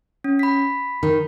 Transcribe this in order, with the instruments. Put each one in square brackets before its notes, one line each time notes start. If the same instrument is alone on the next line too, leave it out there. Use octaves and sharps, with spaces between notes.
[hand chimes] C#4
B5 B6
[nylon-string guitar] D#3